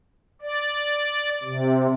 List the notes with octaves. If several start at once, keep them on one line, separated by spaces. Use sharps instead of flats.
D5
C3